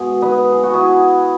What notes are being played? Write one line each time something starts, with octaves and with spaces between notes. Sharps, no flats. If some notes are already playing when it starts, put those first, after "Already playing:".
Already playing: B2 G#3 G#4
B4 D#5
G#4
F#4
E4 G#4